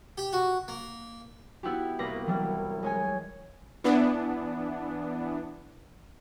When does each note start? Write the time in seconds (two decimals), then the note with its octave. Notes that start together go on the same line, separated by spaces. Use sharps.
0.18 G4
0.33 F#4
0.68 A#3
1.63 B3 E4 F#4 G4
1.99 C2 A#3 B4 D6 A#6
2.26 E3 F#3 G3
2.83 G#3 C#5 G#5
3.84 E3 B3 D4